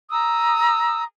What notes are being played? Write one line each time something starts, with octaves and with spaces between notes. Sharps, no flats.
A#5 D#6 E6